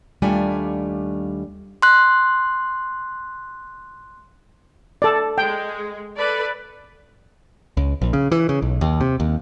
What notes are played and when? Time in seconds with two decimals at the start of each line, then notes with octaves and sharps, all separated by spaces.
0.22 D#2 G3 A3 D4 F4 G#5
1.82 C6 F#6
5.02 A4 D5
5.38 G#3 G5
6.15 A4 B4 D5
7.77 C#2
8.02 A#1
8.13 C#3
8.32 E3
8.49 C#3
8.62 B1
8.81 D#2
9.01 C3
9.20 D#2